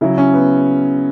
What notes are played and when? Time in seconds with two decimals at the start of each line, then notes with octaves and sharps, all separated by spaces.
0.01 C#3 F#3 E4
0.18 C#4
0.34 B3